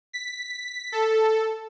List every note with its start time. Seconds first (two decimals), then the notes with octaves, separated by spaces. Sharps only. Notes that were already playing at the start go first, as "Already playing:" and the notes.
0.13 B6
0.92 A4